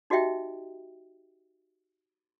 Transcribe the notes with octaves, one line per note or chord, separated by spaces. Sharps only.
D#4 F#4 G4 D#5 E5 G5